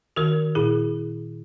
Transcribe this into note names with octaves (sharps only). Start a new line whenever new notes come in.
D#3 F#4 A#4
A#2 E4 G#4